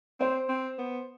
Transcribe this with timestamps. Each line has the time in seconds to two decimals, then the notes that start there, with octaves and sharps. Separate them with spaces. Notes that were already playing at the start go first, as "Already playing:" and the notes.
0.20 C4 C5
0.49 C4
0.78 B3